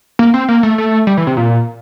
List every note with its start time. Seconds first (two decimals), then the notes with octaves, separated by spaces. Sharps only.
0.19 A#3
0.34 C4
0.48 A#3
0.63 A3
0.78 A3
1.07 G3
1.17 E3
1.27 C3
1.37 A#2